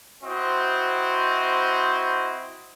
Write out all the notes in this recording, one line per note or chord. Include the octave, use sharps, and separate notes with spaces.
C4 E4 F#4 C5 D#5